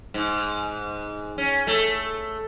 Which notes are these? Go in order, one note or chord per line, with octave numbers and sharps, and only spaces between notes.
G#2
C#4
A3